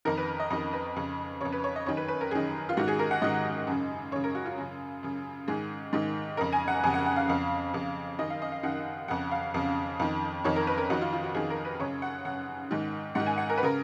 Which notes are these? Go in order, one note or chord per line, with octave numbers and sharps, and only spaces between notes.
F2 D#3 A#4
B4
D#5
F2 D#3 D#5
B4
F2 C#3
F2 C#3 C#5
B4
C#5
D#5
F#2 D#3 C#5
B4
B4
A#4
F#2 D#3 G#4
F4
G#2 D#3 F#4
G#4
A#4
F#5
G#2 D#3 D#5
F#2 C#3
F#2 C#3 C#5
A#4
F#4
F4
F#2 C#3
F#2 C#3
G#2 D#3 G#4
G#2 D#3
F2 C#3 A#4
G#5
F#5
F2 C#3 G#5
F#5
F#5
F5
F2 C#3
F2 C#3
F#2 D#3 D#5
F5
D#5
F5
F#2 D#3 F#5
F2 C#3 F#5
F5
F2 C#3
F2 D#3
F2 D#3 C#5
A#4
B4
A#4
F2 D#3 F#4
F4
F4
F#4
F2 D#3 G#4
A#4
B4
F#2 C#3 C#5
F#5
F#2 C#3 F#5
G#2 D#3
G#2 D#3 F#5
G#5
F#5
A#4
B4
C#3 A#4